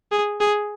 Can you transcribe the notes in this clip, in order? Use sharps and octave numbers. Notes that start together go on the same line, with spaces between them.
G#4
G#4